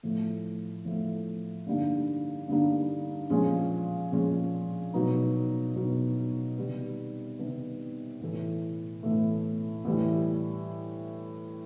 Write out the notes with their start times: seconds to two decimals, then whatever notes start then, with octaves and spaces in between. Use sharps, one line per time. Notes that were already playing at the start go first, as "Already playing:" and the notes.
0.03 A2 F3 A3
0.85 A2 F3 A3
1.66 G2 D3 G3 A#3 D#4
2.48 G2 D3 G3 A#3 D#4
3.30 A#2 F3 G#3 C#4
4.12 A#2 F3 G#3 C#4
4.94 B2 F#3 B3 D#4
5.76 B2 F#3 B3 D#4
6.58 C3 D#3 G3 B3
7.39 C3 D#3 G3 B3
8.21 A2 E3 A3
9.03 A2 E3 A3
9.85 A2 E3 G3